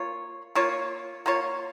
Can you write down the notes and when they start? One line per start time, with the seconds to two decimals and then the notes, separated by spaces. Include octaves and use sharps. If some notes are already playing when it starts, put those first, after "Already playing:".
Already playing: A#3 F4 C#5
0.55 A#3 F4 C#5
1.26 A#3 F4 C#5